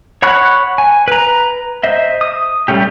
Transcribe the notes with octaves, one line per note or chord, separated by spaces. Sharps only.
C#5 F#5 B5 C#6 F#6
G#5
B4 A#5
C5 D#5 E5
D#6
G3 A3 C#4 G4